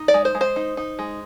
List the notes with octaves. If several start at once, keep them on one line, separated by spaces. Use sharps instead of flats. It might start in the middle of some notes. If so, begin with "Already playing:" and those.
Already playing: D#4
D5
G#3
C5
G#3
C5
D#4
D#4
G#3